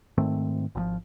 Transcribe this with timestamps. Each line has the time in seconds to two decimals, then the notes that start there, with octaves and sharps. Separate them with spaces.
0.18 G#2 D#3 A3 C4
0.75 G#1 D3 F3